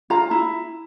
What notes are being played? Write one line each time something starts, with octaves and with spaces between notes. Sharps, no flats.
F4 A#5
E4